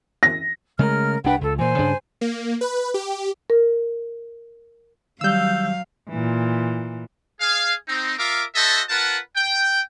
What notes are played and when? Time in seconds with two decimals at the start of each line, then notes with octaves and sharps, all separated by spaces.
0.23 A#6
0.79 C#3 G#3 A3 A#4 F6
1.24 C2 D4 B4 F#5 G5
1.41 C#2 A4
1.59 A#2 E3 C5 G#5
1.79 G2 C#3 D4
2.21 A#3
2.61 B4
2.94 G4
3.50 A#4
5.21 D#3 F#3 G3 F5 E6 G6
6.09 A#2 E3
7.41 G#4 F5
7.88 C4 D#4
8.19 F4 A#4 E5 F5 A#5 D6
8.56 F#4 A4 C5 D#5 E5 A5
8.89 F4 A#4 B4 F#5 A5
9.36 G5